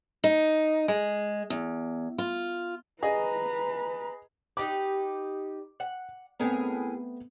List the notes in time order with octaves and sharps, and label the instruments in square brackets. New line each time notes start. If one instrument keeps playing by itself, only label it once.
[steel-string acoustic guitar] D#4
G#3
E2
F4
[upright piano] G#4 D#5 [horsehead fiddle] B4 A#5
[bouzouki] D#4 G4 B4 [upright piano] D6
[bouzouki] F#5
[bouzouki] A2 G#4 A#4 [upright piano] A3 B3 C4